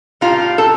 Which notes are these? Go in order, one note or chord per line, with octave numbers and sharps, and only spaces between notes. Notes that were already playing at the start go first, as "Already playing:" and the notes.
A2 G3 A#3 F4 F5
A4 A5